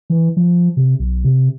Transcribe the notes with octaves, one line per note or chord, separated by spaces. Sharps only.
E3
F3
C3
B1
C3